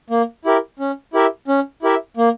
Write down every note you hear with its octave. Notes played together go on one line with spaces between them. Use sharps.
A#3
E4 G4 A#4
C#4
E4 G4 A#4 E5
C#4
E4 G4 A#4 E5
A#3